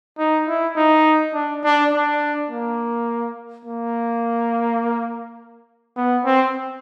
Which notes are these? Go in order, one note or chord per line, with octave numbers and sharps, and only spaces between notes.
D#4
E4
D#4
D4
D4
D4
A#3
A#3
B3
C4